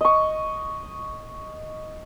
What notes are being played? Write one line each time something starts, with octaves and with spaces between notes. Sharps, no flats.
D#5 C#6